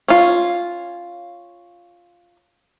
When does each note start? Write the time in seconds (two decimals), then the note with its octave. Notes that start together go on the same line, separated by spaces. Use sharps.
0.08 C#4 F4